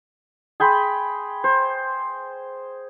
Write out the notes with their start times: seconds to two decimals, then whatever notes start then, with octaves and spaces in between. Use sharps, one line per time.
0.60 G#4 G5 B5 C6
1.44 C5